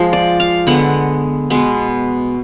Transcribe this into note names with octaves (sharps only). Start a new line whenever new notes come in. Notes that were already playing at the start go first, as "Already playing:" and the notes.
Already playing: F3 G#3
D5
F5
D3 G#3 B3 F#5
B2 G#3 B3